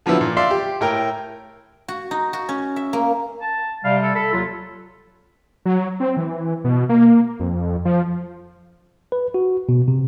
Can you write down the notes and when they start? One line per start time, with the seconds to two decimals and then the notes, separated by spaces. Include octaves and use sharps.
0.06 D3 F3 F#3 B3 E4
0.21 A#2
0.37 D5 E5 F5 C6
0.51 G4
0.81 A2 A#4 G5
1.88 F#4
2.11 D#4
2.33 F#4
2.49 C#4
2.76 E5
2.93 A#3
3.42 A5
3.84 C3 G3 F5
4.02 A4
4.15 A4 B5
4.33 D#2 F#3 F4
5.65 F#3
6.00 C4
6.17 E3
6.64 B2
6.89 A#3
7.40 F2
7.85 F3
9.12 B4
9.34 F#4
9.69 B2
9.88 C3